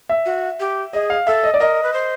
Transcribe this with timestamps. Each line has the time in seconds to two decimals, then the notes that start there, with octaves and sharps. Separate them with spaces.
0.09 E5
0.26 F#4
0.60 G4
0.93 G#4 D#5
1.10 F5
1.27 A4 E5
1.43 D#5
1.54 D5
1.60 A#4 D#5
1.83 B4
1.93 C5